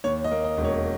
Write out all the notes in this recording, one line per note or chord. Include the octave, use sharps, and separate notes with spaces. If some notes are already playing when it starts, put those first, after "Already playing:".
D#2 C#5
D#5
A#3
D#5
E1
C#5